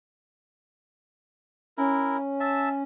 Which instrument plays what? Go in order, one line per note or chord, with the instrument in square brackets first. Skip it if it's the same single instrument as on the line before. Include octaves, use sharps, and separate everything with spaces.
[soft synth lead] C#4 [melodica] E4 A#4
[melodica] E5 A5